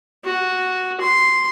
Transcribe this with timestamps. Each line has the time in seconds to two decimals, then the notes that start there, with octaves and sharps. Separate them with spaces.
0.24 F#4
1.00 C6